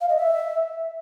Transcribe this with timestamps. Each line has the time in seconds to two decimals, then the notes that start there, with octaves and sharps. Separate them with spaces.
0.01 F5
0.09 D#5
0.17 E5